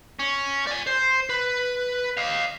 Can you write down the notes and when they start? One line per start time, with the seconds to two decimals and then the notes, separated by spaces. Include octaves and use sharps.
0.19 C#4
0.67 D5 G#5
0.87 C5
1.30 B4
2.17 D#5 F5